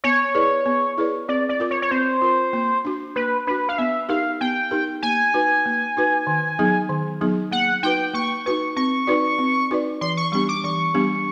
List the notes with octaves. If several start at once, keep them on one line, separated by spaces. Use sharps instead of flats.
B3 C#5
E4 G#4 B4 D5
B3
E4 G#4 B4 D5
C4 D5
D5
F4 A#4
C#5
C#5
C4 C5
F4 A#4
A#3
D4 F#4
A#3 B4
D4 F#4 B4
F5
B3 E5
D#4 G4 A#4 F5
B3 G5
D#4 G4 A#4
A#3 G#5
D#4 F#4 B4
A#3
D#4 F#4 B4
D#3
F#3 B3 D#4 G#4
D#3
F#3 B3 D#4 G#4
A#3 F#5
D#4 F#4 B4 G5
A#3 C#6
D#4 F#4 B4 C#6
C4 C#6
D#4 F#4 B4 D5
C4
D#4 F#4 B4 D5
E3 C6
C#6
G3 B3 D4 G4 C#6
D6
E3 C#6
G3 B3 D4 G4